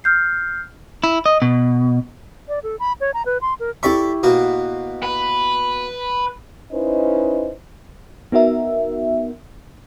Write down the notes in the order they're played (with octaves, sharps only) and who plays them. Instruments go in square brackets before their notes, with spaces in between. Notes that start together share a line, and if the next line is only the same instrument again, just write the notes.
[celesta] F6 G6 C7
[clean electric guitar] E4
D#5
B2
[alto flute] D5
A4
B5
C#5
A#5
B4
C6
A#4
[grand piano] E4 G4 C#6 [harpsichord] A4 D5 E5
[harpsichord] B2 A#3 F#4
[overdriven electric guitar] B4
[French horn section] C#4 D#4 E4 B4 C5 D#5
[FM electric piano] B3 D#4 F#4 A#4 E5